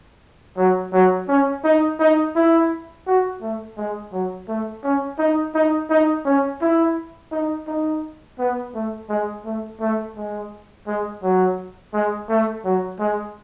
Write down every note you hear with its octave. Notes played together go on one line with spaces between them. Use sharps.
F#3
F#3
C#4
D#4
D#4
E4
F#4
A3
G#3
F#3
A3
C#4
D#4
D#4
D#4
C#4
E4
D#4
D#4
B3
A3
G#3
A3
A3
G#3
G#3
F#3
G#3
A3
F#3
G#3